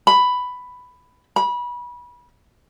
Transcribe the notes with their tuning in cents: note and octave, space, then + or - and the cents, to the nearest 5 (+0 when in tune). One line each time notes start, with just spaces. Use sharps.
B5 +5
B5 -25